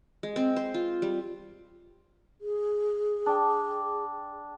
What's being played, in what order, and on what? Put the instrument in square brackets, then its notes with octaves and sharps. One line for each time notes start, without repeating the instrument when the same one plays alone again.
[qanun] G#3
C4
C5
F4
G3
[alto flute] G#4
[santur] D4 G5